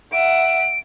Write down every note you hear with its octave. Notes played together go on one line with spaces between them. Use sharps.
E5 F#5 D7